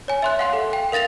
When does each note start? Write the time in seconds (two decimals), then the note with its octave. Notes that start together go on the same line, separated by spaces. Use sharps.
0.08 C#5 G#5
0.22 E5 C6 F#6
0.39 F5 F#5 C6
0.53 A4
0.73 G5
0.92 A#4 F5 A6 A#6 F7